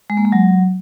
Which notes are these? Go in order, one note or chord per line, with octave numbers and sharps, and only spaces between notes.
G#3
A#3
G#3
F#3